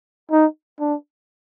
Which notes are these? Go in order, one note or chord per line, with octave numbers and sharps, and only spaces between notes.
D#4
D4